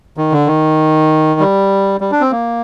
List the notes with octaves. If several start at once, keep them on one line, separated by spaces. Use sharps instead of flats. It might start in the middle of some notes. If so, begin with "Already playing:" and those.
D#3
D3
D#3
G3
G3
D4
C4
A#3